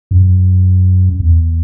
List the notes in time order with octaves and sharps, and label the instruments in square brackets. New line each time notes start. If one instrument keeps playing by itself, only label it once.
[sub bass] F#2
E2